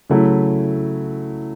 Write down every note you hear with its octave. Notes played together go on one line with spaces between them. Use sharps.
C#3 F#3 A3 E4